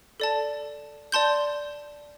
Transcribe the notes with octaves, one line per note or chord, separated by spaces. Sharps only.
A4 D5 A5
D5 A5 C6 G6